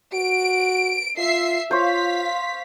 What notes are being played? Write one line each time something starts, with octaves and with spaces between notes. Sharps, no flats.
F#4 D7
F4 E5 C7
F4 C5 C#5 F5 B6